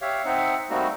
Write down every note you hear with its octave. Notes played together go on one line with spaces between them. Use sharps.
G4 C#5 E5 F5
C4 D#4 E5 F#5
G3 A3 A#3 C4 D#4 F#4